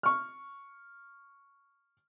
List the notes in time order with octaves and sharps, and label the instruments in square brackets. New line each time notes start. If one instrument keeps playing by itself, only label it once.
[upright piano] C#6 F6